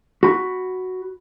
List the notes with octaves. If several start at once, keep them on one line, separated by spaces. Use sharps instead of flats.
F#4 B5